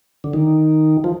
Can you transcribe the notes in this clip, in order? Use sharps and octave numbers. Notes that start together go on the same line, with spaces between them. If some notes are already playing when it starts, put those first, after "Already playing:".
D3
D#3
F3